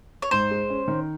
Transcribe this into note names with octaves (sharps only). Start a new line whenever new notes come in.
C#5
G#2 C5
G#3
C#4
D#3